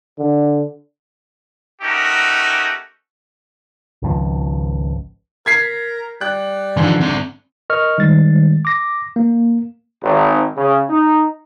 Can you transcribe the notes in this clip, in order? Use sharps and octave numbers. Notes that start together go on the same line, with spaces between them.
D3
A3 C#4 D#4 F#4 G4 A#4
G#1 C#2 F3
A#4 G#6 B6 C7
G3 F#6
G#2 D3 E3 F3
C4 D5
A#4 D#5 C#6 F6
D#3 G3 G#3 A6
D6 A#6
A#3
G#1
C#3
D#4